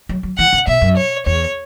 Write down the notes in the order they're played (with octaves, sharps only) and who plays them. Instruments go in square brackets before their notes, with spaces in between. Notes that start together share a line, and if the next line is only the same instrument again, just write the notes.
[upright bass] F#3
F#3
[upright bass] E3 [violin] F#5
[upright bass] C#3
[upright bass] B2 [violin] E5
[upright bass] F#2
[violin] C#5
[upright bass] E2 [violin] C#5